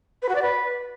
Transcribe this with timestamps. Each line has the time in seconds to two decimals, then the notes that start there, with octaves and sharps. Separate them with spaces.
0.22 B4
0.29 F#4
0.36 D5
0.42 B4